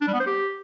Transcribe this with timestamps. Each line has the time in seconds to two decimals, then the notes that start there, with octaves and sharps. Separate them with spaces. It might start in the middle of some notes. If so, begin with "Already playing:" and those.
0.01 D4
0.08 G3
0.14 B3
0.20 C5
0.26 G4